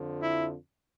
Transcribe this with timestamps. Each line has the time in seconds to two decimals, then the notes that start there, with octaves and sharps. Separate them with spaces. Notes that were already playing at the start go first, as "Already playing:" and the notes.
Already playing: F2 D3 F3
0.22 E4